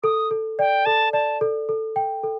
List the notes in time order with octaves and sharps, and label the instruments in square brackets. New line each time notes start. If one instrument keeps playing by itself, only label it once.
[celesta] A4 [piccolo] D#6
[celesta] A4
[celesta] D5 [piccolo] G5
[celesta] A4 [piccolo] A5
[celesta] D5 [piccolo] A5
[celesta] A4
A4
G5
A4